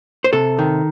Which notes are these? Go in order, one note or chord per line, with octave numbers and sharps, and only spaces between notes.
C5
C3 A4
D#3